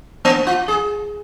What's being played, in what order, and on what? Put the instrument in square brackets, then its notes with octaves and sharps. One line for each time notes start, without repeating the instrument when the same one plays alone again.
[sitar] A#3
F4
G#4